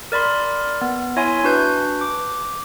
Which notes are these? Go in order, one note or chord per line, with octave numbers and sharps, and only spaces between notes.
A#4 D5 B5 C6
B3
E4 C#5 E5 G#5 C6
D4 F#4 B4 G6
D6